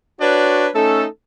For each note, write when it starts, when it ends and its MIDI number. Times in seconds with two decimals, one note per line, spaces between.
0.21 0.68 62
0.21 0.68 66
0.21 0.68 71
0.21 0.68 73
0.21 0.68 74
0.74 1.05 57
0.74 1.05 61
0.74 1.05 63
0.74 1.05 69